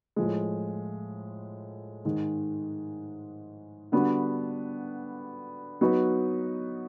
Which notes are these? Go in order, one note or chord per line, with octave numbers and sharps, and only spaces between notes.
A2 F3 G#3
G#2 D#3 G#3
D3 G3 B3 D4 F#4
F#3 B3 D#4 F#4 B4